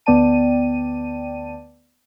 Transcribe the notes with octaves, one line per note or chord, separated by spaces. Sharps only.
D2 B3 D5 G5 A5 D#7